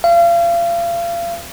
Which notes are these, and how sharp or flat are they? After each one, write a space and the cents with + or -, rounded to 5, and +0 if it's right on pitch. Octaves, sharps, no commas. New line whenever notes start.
F5 -35